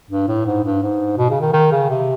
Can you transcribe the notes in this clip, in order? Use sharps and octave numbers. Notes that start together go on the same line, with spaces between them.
G2
A2
G#2
G2
G#2
B2
C#3
D#3
D#3
C#3
C3